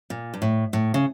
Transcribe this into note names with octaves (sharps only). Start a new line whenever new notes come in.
A#2
G2
A2
A2
C#3